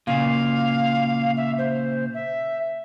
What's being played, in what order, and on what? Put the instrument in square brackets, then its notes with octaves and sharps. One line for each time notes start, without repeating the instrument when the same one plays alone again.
[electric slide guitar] A#2 C#3 [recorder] F5
[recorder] E5
C5
E5